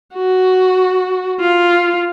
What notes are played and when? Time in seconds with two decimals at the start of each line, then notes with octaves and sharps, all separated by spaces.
0.15 F#4
1.40 F4